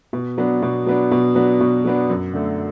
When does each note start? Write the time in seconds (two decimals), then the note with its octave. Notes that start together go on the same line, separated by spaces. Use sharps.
0.13 B2
0.38 F#3 B3 D4
0.62 B2
0.86 F#3 B3 D4
1.11 B2
1.35 F#3 B3 D4
1.60 B2
1.85 F#3 B3 D4
2.10 F#2
2.34 D3 A3